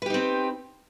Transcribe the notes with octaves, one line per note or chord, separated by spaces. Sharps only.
C4 D#4 G4 B4